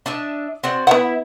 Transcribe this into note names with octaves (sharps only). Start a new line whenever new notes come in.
D4 D#5 E5
C4 F#4 D5
B3 E4 E5 F#5